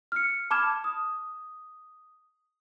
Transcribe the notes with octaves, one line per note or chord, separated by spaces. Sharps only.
F6 C#7
A5 B5 D6 F6 G#6 E7
D#6